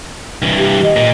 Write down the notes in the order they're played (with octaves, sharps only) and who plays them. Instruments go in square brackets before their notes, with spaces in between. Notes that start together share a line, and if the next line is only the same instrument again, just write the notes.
[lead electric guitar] G2 E3
[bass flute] G4
D#5
[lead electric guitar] A#2